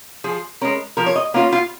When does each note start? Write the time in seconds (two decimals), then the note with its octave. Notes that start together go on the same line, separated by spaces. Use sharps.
0.24 F3 G#4
0.61 G#3 C#4 A#4
0.97 F3 A#4
1.06 C#5
1.16 D#5
1.34 A#3 C#4 F4 F5
1.52 F4